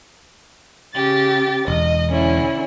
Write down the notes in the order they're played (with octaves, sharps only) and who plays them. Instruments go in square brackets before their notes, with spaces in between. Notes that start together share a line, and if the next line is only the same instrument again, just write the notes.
[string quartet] C#3 G4 A6
[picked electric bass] E1 [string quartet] D#5
[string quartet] D3 C#4 E4